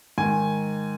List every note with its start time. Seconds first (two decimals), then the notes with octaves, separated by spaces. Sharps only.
0.18 G#2 D#3 G#5